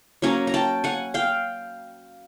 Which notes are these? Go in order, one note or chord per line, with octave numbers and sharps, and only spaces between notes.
F#3 A#3 C#4 G#5 A#5
A#5
G5 A5
F#5 G#5
F5 G5